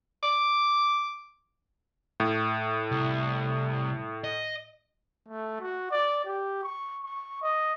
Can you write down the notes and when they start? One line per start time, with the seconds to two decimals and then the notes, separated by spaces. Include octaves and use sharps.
0.23 D6
2.20 A2
2.92 C2
4.24 D#5
5.28 A3
5.61 F#4
5.91 D5
6.25 G4
6.63 C#6
7.04 C#6
7.42 D#5